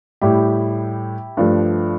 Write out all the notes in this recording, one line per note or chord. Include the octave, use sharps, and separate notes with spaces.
A2 G3 E4 G4
G2 F3 A3